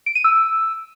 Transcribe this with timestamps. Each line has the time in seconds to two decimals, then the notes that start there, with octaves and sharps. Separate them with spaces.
0.06 D7
0.15 D#7
0.24 E6